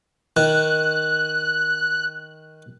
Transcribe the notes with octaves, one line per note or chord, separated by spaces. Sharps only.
D#3 F#6